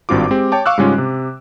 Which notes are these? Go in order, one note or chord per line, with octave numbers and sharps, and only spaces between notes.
G#1 G2 C4 F4 F#4 D6
G#3 C4 G4
C#5 G5 A5 D6
F5 C#6 D6 E6 F#6
G#2 C#3 G3 G#3 C#4 F4
C3